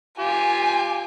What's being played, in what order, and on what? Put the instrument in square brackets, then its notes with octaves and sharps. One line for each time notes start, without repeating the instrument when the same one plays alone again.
[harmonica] F4 G4 [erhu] G#5